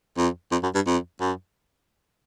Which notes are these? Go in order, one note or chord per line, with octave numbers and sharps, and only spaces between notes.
F2
F2
F#2
G2
F2
F#2